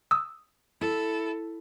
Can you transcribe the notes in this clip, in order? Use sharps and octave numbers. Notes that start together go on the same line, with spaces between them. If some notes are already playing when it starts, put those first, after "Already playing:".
D#6 E6
E4 A4